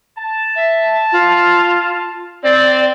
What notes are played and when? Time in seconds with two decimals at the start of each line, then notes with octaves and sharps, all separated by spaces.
0.18 A5
0.56 E5
1.12 F4
2.43 C4 D5